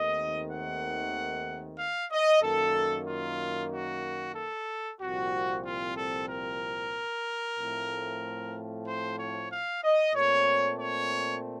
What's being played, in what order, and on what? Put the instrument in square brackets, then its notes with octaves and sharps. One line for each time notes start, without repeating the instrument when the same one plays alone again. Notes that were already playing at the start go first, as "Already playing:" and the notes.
Already playing: [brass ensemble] D#2 D#3 A3 C4 D#5
F#5
F5
D#5
F#2 D#3 A#3 A4
F4
F#4
A4
C2 A#2 F3 C4 F#4
F4
A4
A#4
A2 F3 A3 C4
C5
C#5
F5
D#5
A#2 A3 C4 C#5
C#5